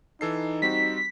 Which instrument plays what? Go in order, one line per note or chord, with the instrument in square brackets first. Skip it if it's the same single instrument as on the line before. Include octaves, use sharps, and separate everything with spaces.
[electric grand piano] E3 A4 C7 [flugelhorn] D#4
[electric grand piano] G3 C4 F#4 [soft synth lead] B6